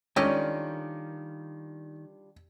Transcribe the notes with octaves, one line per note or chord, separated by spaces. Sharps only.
D#3 G3 A3 C#4 D4 F4 G4 D#5